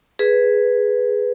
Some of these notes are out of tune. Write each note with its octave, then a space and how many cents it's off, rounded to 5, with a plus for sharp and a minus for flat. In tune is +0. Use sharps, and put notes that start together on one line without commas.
G#4 +0 B4 +0